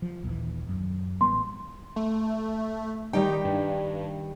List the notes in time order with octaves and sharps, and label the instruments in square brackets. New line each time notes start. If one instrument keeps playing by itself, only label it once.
[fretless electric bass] F3
A#1 D#2 E3
F#2
[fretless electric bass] A1 G3 B3 [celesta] C6
[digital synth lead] A3
[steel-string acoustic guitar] D#3 G3 G5 [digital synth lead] D#4
[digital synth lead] G2